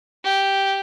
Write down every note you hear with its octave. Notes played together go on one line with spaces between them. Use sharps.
G4